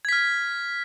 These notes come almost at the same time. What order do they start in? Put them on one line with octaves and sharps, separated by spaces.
G#6 B6 F6